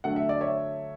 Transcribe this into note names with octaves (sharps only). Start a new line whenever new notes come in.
D3 F#3 A3 F#5
E5
D5
C#5 E5